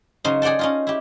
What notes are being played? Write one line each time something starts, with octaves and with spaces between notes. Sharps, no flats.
C#3 F#3 D#4 C5
G#4 D5 F#5 G5 A5
C#4 D#4 F4
E4 G4